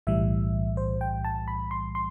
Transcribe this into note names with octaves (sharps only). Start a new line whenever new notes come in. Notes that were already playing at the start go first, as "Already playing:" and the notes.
B1 A2 E3 G3 E5
C5
G5
A5
B5
C6
C6